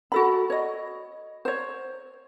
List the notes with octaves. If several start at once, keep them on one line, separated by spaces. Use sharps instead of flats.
F#4 A4 B5
C#5 D#5
C5 C#5